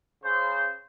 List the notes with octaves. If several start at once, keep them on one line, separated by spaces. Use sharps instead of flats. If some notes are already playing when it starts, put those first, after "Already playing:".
C#3 C5